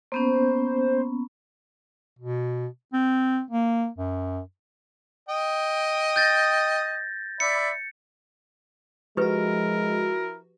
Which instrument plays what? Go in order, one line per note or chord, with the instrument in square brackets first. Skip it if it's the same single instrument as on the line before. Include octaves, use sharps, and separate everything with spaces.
[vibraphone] A#3 B3 C#4 [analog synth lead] C5
[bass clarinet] B2
C4
A#3
F#2
[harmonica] D#5 G5
[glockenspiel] G6 A6 A#6
[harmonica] D5 E5 B5 [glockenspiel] C#7
[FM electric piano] F3 F#4 [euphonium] G#3 [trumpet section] E4 A#4 [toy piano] G4 B4